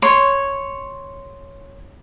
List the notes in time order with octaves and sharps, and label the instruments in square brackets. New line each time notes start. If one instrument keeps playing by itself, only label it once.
[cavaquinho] C#5 C6